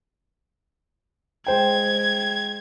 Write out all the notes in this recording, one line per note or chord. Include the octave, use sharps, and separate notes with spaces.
G#3 C5 G5 G#6